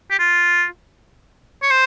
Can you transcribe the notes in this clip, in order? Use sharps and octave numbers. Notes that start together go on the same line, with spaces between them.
G4
F4
C#5
C5